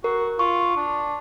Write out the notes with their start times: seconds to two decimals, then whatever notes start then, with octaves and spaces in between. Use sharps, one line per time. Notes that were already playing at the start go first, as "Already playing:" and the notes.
0.04 F#4 A#4
0.39 F4 C#6
0.77 D4